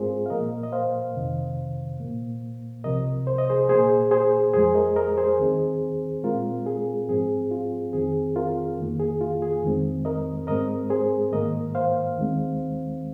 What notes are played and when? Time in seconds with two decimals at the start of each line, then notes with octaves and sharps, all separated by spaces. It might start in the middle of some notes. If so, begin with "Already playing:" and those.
Already playing: G#2 G#3 C4 F4 G#4 A#4 C5
0.26 F5
0.30 A#2 F3 A#3 A#4 D#5
0.63 D#5
0.72 C5 F5
1.15 F2 C3 D#3
2.00 A#2 A#3
2.84 C2 C3 F3 A#4 D#5
3.27 C5
3.38 D#5
3.50 G#4 C5
3.69 A#2 A#3 G#4 C5
4.11 G#4 C5
4.54 F2 F3 G#3 G#4 C5
4.75 A#4 D#5
4.96 A#4 D#5
5.17 G#4 C5
5.39 D#2 D#3 C4
6.24 A#2 G#3 C4 F4 A#4
6.66 G#4
7.08 G#2 F3 C4 G#4
7.51 F4
7.93 F2 D#3 C4 G#4
8.36 F4 A#4
8.78 F2 D#3 A#3
8.99 G#4
9.21 F4
9.42 G#4
9.62 F2 D#3 G#3 C4
10.05 A#4 D#5
10.47 G#2 G#3 C4 A#4 D#5
10.90 G#4 C5
11.32 G#2 D#3 A#3 A#4 D#5
11.75 C5 F5
12.17 D#2 D#3 G#3 C4